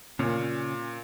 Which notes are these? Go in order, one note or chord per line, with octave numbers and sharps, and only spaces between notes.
A#2 C#3 C#4